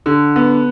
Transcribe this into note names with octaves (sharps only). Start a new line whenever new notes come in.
D3
B3